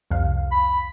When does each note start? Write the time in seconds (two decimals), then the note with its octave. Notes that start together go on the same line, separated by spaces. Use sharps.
0.11 C2 F2 F5
0.52 B5